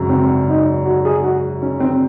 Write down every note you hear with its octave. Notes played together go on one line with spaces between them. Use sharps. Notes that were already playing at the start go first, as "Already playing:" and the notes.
Already playing: G#1 F#2 C#3
C4
D#4
F#4
G#4
F#4
C#4
C4